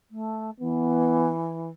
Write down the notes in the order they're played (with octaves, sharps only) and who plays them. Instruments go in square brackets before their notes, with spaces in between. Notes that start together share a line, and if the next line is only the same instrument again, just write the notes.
[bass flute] A3
[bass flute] E3 [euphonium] B3